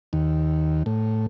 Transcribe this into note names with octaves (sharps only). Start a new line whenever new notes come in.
D#2
A2